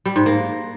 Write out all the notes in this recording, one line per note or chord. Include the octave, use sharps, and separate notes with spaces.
G3
G#2
A#3